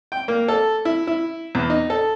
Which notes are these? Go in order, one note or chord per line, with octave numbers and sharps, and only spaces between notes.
G5
A#3
A4
E4
E4
E2
D#4
A4